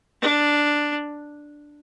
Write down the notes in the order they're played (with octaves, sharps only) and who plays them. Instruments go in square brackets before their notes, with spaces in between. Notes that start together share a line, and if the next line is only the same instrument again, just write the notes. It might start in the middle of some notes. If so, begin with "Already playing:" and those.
[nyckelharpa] D4